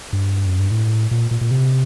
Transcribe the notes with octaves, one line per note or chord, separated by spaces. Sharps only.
G2
F#2
G2
A2
A#2
A#2
A#2
C3